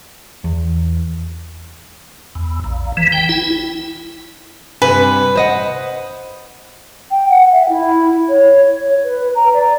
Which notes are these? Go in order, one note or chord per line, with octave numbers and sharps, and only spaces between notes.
E2
E2
A#1
E3
G5
E4
G2 C3 B4 G#5
C5 D#5 F#5
G5
F#5
E5
E4
C#5
C#5
B4
A#5
D5